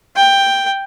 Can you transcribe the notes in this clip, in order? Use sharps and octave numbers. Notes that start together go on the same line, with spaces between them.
G5